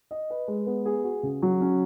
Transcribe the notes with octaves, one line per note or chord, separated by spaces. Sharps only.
D#5
B4
G#3
B3
G#4
F#4
C#3
F#3
C#4